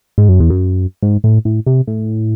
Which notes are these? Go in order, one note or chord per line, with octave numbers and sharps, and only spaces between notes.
G#2
F#2
E2
F#2
G#2
A2
A2
C3
A2